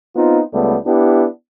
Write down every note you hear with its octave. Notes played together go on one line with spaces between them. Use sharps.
B3 C4 D#4 F4
C#2 G3 A3 B3
B3 D4 E4 G4